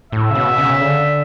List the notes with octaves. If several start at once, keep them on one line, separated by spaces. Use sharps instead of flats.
A2 E5
C#3
B2
C#3
D3